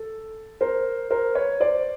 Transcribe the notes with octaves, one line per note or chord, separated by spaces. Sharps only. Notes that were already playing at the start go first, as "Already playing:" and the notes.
Already playing: A4
A#4 C5
A#4 C5
B4 C#5
C5 D5